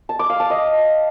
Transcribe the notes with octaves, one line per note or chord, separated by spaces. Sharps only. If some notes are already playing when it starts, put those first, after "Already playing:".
A5
D6
F5
A5
D#5